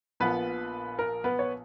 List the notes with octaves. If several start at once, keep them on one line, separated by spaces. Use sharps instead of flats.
A#1 A#2 F3 B3 B4
A#4
B3 B4
C#5